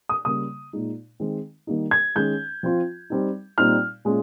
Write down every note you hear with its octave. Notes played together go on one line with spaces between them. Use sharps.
D#6
C#3 G3 A#3 D#6
A#2 G#3 D#4
D#3 G#3 C4
D#3 G3 A#3 D#4
G#6
D#3 G#3 C#4 G6
F3 C4 F4
G3 C4 D#4
A#2 G3 C4 D#4 F6
A#2 G#3 C#4 F4